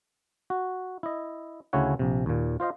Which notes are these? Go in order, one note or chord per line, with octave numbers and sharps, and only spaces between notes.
F#4
E4 D#5
D2 C#3 C#4 E4 C#5 F#5
A#1 C3
D#2 A#2
F4 C5 D#5 F5